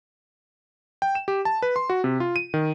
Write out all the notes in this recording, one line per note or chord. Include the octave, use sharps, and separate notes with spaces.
G5
E7
G4
A5
B4
C6
F#4
C3
F4
D#7
D#3